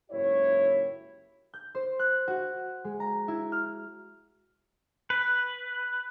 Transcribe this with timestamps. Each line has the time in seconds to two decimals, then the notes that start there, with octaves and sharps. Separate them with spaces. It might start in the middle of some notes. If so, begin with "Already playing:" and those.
0.11 F#1 G#2 E4 G4 C#5
1.54 G6
1.75 C5
1.99 F#6
2.28 F#4
2.84 G#3
3.00 A#5
3.28 E4
3.52 F6
5.10 B4